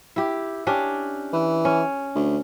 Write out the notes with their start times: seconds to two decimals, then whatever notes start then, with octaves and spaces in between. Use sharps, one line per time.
0.16 E4 G4
0.67 C#4 D4 G4
1.33 E3
1.65 C#4
2.15 D2